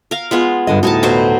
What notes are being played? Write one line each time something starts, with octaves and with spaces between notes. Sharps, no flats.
A#4 F5
G#3 B3 F4
G2 D3 D#5
D2 A2 D#4 F#4 G#5 A5
B2 F#3 C5